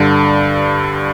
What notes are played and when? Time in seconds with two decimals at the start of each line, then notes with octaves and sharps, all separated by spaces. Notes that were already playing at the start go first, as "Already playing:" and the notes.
Already playing: G2 D3